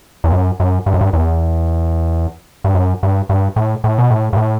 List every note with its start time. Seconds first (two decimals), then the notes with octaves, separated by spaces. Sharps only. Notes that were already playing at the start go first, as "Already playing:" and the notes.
0.24 E2
0.32 F#2
0.60 F#2
0.86 G2
0.94 F#2
1.01 G2
1.13 E2
2.64 G2
2.75 F#2
3.03 G2
3.29 G2
3.56 A2
3.84 A2
3.98 B2
4.10 A2
4.33 G2
4.37 A2